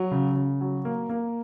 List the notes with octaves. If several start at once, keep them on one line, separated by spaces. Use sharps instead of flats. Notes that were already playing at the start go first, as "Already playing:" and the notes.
Already playing: F#3
C#3
C#3
F#3
A#3
A#3